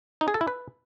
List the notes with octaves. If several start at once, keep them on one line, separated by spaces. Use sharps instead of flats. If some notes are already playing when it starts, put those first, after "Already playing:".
D#4
G#4
A4
E4
B4